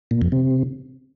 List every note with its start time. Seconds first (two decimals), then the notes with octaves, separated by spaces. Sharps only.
0.11 A#2
0.22 F2
0.32 C3